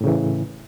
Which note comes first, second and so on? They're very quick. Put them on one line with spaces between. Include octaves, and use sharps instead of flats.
A2 C#3 E3